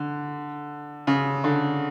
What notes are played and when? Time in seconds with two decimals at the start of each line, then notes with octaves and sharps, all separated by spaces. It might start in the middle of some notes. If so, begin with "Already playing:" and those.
Already playing: D3
1.07 C#3
1.44 D3